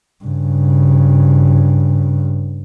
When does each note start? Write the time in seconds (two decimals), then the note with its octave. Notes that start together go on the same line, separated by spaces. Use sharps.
0.24 G2 C#3